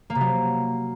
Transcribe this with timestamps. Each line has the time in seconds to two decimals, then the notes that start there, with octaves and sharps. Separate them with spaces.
0.10 A#3
0.15 C3
0.21 F#3